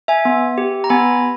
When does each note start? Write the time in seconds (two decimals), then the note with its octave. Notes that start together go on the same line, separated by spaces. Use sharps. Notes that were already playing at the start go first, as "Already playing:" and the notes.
0.08 E5 G#5
0.25 B3
0.58 G4
0.84 A#5
0.89 B3 G#5 B5